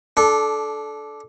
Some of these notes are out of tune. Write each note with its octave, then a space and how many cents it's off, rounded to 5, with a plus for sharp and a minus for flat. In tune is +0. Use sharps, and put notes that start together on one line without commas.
D4 +0 A4 -20